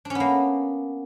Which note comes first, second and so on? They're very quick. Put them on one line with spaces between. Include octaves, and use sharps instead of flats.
D4 C#4 B3 A#3